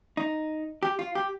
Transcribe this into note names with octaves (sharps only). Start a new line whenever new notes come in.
D#4
G4
F4
G4